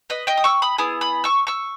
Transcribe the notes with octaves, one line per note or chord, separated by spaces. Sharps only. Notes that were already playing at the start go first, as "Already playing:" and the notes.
B4 D#5
D#5 G5
D#6
C#6 E6
B5 D#6
B3 E4 G#4 D#6
B5 D#6
C#6 E6
C#6 E6